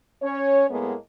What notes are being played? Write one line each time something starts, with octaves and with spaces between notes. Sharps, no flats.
C#4 C#5
A2 G#3 A#3 B3